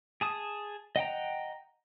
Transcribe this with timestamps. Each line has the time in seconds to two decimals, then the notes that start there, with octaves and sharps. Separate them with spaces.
0.21 G#4 A5 D#6
0.96 D#5 F#5 G5 A#5